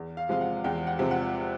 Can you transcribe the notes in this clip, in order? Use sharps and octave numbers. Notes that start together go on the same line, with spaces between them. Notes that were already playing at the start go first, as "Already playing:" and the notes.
Already playing: E2
F5
C3 F3 G#3 F5
F#5
E2 G5
F#5
C3 F3 G#3
F#5